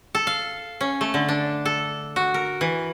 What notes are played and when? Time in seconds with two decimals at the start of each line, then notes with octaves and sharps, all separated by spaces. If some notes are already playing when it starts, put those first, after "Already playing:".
0.15 A4
0.27 F5
0.81 C#4
1.01 A3
1.14 D3
1.29 D4
1.65 A4
2.16 F#4
2.34 A#4
2.61 E3